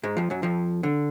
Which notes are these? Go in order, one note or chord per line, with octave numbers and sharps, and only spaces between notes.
G#2 G#3
F2 F3
F#2 F#3
F2 F3
D3